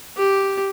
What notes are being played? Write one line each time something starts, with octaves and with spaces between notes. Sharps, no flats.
G4